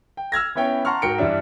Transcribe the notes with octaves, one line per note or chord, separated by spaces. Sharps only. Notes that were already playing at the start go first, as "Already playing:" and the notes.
G5
E6 F6 G#6 A#6
B3 C#4 E4 C#5 G5
F#5 A5 A#5 C6 C#6 F6
G#2 F#4 A#4 G5 C#7 D7
G2 E3 G3 D4 E5